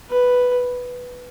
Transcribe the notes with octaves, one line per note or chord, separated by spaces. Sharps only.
B4